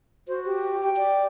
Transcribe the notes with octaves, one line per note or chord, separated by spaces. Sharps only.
F#4 C5
G4
G5
D5